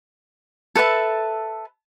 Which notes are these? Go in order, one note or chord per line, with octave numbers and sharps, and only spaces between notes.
A4 B4 E5 A5